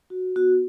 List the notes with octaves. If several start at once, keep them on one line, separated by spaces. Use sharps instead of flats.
F#4
B3 F#4